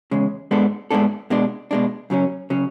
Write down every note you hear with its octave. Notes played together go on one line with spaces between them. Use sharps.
E2 C#3 G#3
G#2 G#3 B3 D4 A4
G#2 G#3 B3 D4 A4
B2 G#3 D4
B2 G#3 D4
F#2 C#3 F#3 C#4
C#3 F#3 C#4